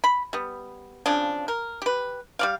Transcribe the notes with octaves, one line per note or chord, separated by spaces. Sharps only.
B5
G3 B3
C#3 F3 C4 D4
A#4
G4 B4
G3 D5 F5